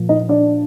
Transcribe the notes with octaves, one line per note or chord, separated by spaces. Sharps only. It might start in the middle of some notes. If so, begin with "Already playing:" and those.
Already playing: A#2 F3 A#3
D#4 D#5
D4 D5